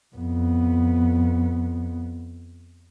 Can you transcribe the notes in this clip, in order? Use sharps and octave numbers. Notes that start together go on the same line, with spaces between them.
F2 B3